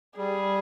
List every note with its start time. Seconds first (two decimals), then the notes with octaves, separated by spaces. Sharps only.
0.17 G3 G#4